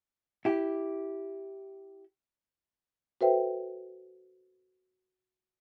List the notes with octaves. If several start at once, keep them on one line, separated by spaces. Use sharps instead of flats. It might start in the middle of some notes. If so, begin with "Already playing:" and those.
E4 G4
F#4 A4 B4 C5 E5 G5